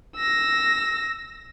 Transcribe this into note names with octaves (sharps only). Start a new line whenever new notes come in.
E6 A#6